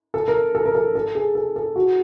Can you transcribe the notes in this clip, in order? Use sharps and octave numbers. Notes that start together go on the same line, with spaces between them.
A4
A#4
A4
A#4
A4
A4
G#4
A4
A4
F#4